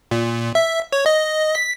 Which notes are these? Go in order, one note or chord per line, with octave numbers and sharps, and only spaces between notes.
A#2
E5
C#5
D#5
B6